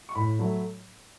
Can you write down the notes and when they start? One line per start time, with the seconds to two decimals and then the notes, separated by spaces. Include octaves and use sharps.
0.09 C#6
0.15 A2 B5
0.39 F#3 A3